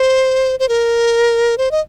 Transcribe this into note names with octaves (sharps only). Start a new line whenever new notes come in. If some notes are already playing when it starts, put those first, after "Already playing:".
Already playing: C5
C5
A#4
C5
D#5